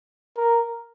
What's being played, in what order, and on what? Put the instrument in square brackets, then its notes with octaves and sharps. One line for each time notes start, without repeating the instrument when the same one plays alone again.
[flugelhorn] A#4